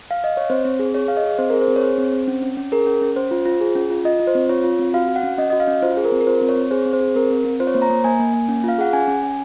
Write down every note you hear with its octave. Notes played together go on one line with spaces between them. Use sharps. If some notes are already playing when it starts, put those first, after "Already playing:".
F5
D#5
C#5
C4 C5
C4
G#4
G#4 C#5
G#4 F5
D#5
G#4
C4 C5
G#4 A#4
C5
C4
C#5
G#4 C5
C4
C4
C#4
C#4
C#4
G#4 A#4
C#4
C#4
C#4 C5
F4
F4
G#4
C#4
F4
F4 D#5
F4
C5
C4
F4 C#5
F4
C4
F#4 F5
F#4
F#5
C#4
C#4 D#5
F#4 D#5
F5
C#4
F4 C5
G#4
A#4
C4
A#4
F4 C5
C4
C#5
C4
G#4 C5
C4
C5
G#4
C4 A#4
C4
C4
F4 C5
C#5
A#3 C5
A#5
A#3
A#3 G#5
A#3
A#3
C#4
F4 F5
G#4 F#5
C#4 G#5
C#4
C#4